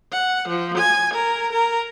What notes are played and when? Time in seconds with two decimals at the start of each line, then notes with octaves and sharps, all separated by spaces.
0.12 F#5
0.48 F3
0.77 G#5
1.14 A#4
1.53 A#4